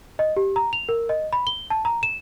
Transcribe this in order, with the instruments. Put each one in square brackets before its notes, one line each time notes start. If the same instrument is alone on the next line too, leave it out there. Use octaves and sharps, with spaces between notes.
[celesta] D#5
G4
A#5
F7
A#4
D#5
B5
G7
A5
A#5
E7